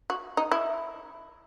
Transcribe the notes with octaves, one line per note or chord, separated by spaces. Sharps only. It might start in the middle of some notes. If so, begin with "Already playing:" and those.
F#4
D#4
E4